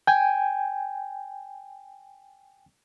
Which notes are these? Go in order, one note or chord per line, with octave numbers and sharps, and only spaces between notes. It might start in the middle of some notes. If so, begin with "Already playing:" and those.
G5 G#5